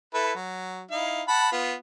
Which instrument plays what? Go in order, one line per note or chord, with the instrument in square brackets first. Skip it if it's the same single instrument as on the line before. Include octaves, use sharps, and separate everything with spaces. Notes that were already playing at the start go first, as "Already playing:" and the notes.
[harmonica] E4 A4 B4
F#3
D#4 E4 F5
F#5 A5 B5
B3 F4